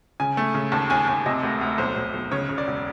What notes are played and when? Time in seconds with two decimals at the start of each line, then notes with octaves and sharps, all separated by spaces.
0.20 C#3 G#5
0.37 A3
0.54 C#3
0.72 D#2 A5
0.90 D#2 G#5
1.08 D#2 G#5
1.26 C3 D#5
1.43 D2
1.61 D2
1.78 B1 C5
1.96 B1
2.14 B1
2.31 C#3 C#5
2.49 C#3
2.58 D5
2.67 E1